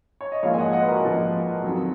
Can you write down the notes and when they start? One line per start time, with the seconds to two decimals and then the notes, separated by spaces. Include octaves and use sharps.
0.21 C#5
0.32 D#5
0.43 A#1 G#2 F3 A#3 C#5 F5
0.54 G#5
0.58 D#5 F#5
0.73 D#5 F#5
0.82 B4
0.88 F#4 A#4
1.03 A#1 G#2 F3 A#3
1.63 F2 D#3 F#3